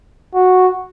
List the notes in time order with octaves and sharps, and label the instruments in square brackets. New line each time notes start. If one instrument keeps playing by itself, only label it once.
[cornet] F#4